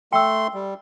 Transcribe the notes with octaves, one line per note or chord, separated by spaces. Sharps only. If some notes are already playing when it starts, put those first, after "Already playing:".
A3 G5 C6 E6
G3